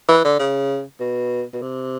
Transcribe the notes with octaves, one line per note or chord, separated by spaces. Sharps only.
E3
D3
C#3
B2
B2
C3